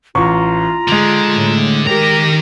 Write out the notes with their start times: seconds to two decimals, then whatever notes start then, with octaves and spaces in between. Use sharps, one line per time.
0.15 A1 F4 A#5 C#6
0.88 D3 G#3 F7
1.34 A2
1.87 D#3 G4 A#4 A#5